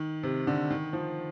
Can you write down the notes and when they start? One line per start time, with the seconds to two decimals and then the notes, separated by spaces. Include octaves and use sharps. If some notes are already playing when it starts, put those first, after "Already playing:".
Already playing: D#3
0.23 C3
0.47 D3
0.70 D#3
0.93 F3